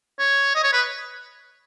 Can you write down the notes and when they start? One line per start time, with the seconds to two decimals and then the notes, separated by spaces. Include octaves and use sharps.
0.19 C#5
0.55 D#5
0.64 C#5
0.73 B4